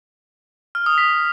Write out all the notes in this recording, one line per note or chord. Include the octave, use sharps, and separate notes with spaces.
F6
D#6
B6